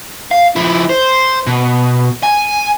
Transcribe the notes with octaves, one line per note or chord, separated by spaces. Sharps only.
F5
F3 E4
C5
B2
G#5